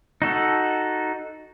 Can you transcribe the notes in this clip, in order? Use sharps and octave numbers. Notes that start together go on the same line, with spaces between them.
D#4 F#4 A4